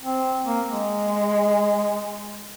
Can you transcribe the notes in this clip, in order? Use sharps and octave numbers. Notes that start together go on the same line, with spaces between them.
C4
A#3
G#3